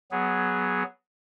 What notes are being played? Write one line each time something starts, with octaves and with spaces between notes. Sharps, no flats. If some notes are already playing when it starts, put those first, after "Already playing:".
F#3 B3 G#4